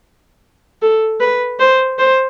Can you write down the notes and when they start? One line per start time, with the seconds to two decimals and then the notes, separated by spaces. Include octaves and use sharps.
0.82 A4
1.20 B4
1.60 C5
1.99 C5